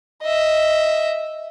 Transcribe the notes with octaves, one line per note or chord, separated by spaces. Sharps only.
D#5 E5